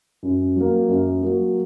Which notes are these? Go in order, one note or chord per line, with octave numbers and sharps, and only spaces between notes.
F#2
F#3 A#3
F#2
F#3 A#3